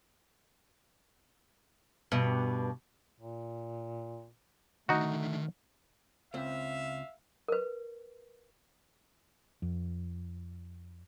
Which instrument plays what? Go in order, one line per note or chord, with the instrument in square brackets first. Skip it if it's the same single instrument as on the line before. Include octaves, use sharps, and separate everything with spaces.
[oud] G2 B2
[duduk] A#2
[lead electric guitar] D3 D#3 [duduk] A3 [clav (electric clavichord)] D#4 F#4
[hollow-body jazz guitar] C#2 C4 [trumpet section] E5 F5
[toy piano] A#4 B4
[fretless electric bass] F2